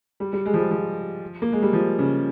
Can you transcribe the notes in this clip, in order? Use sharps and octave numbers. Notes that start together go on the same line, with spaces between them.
G3
G3
G#3
F3
G3
F3
A#3
G#3
G3
F3
C#3